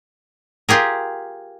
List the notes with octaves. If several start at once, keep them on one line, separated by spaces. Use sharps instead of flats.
F4 G4 G#4 A#4